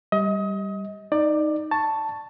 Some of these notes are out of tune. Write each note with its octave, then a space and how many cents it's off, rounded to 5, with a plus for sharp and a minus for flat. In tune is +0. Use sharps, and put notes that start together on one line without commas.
G3 +0 D#5 +30
D#4 +0 D5 +20
A5 +5 C#6 +0